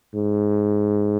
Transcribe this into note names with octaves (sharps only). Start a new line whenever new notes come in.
G#2